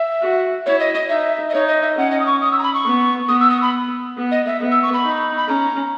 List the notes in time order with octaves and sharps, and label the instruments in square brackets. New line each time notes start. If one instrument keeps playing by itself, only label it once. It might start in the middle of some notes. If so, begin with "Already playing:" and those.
Already playing: [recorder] E5
[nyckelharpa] F#4
[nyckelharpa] E4 [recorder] C#5
[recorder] D#5
D#5
[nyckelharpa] D#4 [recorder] E5
[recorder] D#5
[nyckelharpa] D#4 [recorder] C#5
[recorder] D#5
E5
[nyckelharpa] C#4 [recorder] F#5
[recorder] D#5
D#6
C#6
D#6
E6
A#5
B5
C#6
[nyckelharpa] B3
[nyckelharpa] B3 [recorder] D#6
[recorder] E6
D#6
B5
[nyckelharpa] B3
[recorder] D#5
E5
[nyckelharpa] B3
[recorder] E6
C#6
B5
[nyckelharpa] D#4
[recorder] B5
[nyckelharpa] C#4 [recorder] A#5